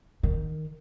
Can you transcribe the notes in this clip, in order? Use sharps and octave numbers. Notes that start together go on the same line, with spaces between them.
D#3